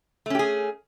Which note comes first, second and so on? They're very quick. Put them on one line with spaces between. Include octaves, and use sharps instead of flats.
A3 C#4 G4 G#4